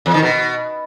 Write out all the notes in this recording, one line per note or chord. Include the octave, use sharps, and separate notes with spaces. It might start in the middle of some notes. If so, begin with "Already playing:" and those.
E2
D#3
B2